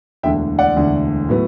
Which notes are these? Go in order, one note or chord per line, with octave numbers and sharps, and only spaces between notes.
E1 D2 D3 E5 G5
D5 F#5
E1 D2 D3
A2 F#3 B3